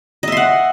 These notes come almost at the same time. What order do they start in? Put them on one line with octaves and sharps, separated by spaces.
D#5 E5 C6 F#5